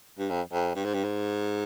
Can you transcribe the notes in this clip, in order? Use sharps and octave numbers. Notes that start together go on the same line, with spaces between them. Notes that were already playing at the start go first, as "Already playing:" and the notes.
G2
F2
F2
G2
G#2
G2
G#2